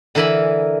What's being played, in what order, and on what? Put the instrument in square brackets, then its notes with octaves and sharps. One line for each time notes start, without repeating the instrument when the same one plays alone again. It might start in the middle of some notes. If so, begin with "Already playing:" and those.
[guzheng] D3 E3 A#4 E5 G#5 B5